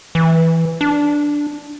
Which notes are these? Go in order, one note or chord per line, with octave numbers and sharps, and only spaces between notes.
E3
D4